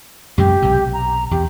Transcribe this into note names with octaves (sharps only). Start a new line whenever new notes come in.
F#2 C3 G#3 G4
B1 C3
A#5
E2 G4